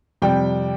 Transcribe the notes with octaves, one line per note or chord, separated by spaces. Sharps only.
F2 C3 G3 G5